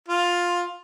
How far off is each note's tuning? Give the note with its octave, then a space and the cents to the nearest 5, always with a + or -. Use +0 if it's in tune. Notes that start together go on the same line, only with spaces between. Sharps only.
F4 +10